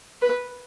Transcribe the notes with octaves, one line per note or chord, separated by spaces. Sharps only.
B4